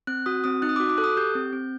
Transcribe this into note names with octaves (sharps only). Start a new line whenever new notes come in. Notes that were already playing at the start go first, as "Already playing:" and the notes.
C4 F#6
F#4 D#6
C4 D#6
D#4 F#6
D#6
F#4 D6
D6
A4 F#6
D#6
G4 G6
C4
C4